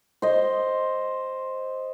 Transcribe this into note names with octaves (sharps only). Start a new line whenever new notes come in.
C5 D#5